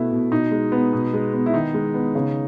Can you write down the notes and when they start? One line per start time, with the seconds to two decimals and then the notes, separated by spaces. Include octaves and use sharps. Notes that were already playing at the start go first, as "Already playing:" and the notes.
Already playing: B2 A3 B3 E4
0.12 B2
0.32 B2 D#4
0.51 G#3
0.72 B3
0.93 B2
1.13 G#3
1.33 B3
1.46 E4
1.54 D#3 D#4
1.74 G#3
1.94 B3
2.15 C#3